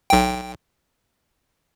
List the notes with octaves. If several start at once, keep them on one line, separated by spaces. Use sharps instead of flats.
B1 G5